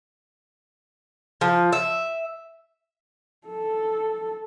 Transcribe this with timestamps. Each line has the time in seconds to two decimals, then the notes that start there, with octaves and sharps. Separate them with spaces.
1.41 F3
1.73 E5
3.48 A4